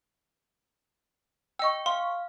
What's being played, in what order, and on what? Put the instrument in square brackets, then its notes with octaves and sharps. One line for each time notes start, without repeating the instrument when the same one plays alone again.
[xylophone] D#5 E6 [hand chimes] G5 C#6
[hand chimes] F5 [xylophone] C6